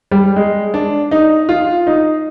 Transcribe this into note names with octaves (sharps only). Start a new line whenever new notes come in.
G3
G#3
D4
D#4
F4
D#4